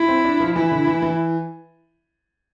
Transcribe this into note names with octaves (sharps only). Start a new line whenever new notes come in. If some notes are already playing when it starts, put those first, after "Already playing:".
Already playing: E4
C4
D4
F3
E3 E4
D3
E3
E3